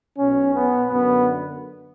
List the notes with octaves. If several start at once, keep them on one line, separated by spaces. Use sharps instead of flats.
B1 B2 C#4
B3
F#2 D3 B3